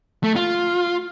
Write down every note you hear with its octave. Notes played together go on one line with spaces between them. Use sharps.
A3
F4